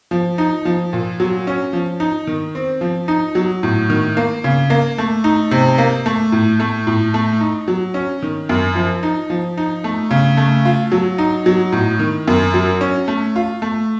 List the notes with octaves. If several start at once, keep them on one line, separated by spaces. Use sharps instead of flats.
F3
D#4
F3
A#2
F#3
C#4
F3
D#4
D#3
C4
F3
D#4
F#3
A2
D#3
A#3
C#3
A#3
A3
D#4
C3
A#3
A3
A2
A3
A2
A3
D#4
F#3
C#4
D#3
F#2
F3
D#4
F3
D#4
A3
C#3
A3
F4
F#3
D#4
F#3
A2
D#3
F#2
F#3
C#4
A3
F4
A3